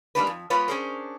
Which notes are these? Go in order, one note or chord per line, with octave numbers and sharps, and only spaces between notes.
G3 G#3 A#3 D4 D#4 B4
F2
G#3 B3 F4 B4 C#5
C#4 D4 G#4 A#4 C5